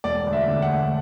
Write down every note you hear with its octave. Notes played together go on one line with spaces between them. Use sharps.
E1 D5
D2
E5
D3
F#5
A3